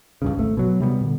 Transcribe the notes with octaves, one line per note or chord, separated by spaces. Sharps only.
C#2 G2 C#3
G#1 A3
B2 F#3
C3 G3 A3 B3
A#2 D3